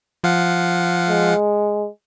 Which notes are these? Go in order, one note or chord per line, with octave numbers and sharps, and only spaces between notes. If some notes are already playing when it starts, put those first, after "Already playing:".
F3 F5 F#5
G#3